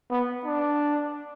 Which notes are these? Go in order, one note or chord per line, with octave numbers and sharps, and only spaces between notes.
B3
D4